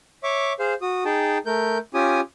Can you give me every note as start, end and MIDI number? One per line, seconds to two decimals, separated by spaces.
0.23 0.53 73
0.23 0.53 76
0.23 0.53 85
0.23 0.53 86
0.60 0.74 68
0.60 0.74 72
0.60 0.74 77
0.82 1.04 66
0.82 1.04 87
1.05 1.38 63
1.05 1.38 68
1.05 1.38 79
1.05 1.38 81
1.46 1.78 57
1.46 1.78 70
1.46 1.78 91
1.94 2.20 61
1.94 2.20 65
1.94 2.20 67
1.94 2.20 80
1.94 2.20 87